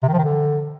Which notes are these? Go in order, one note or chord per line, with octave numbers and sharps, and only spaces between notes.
C3
D#3
F3
D#3
D3